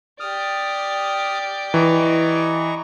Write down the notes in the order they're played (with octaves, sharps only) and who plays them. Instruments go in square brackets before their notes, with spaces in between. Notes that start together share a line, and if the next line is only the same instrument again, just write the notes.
[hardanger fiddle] G4 D5 [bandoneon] D#6 F6
[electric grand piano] E3 [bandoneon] D#5 A#5 C#6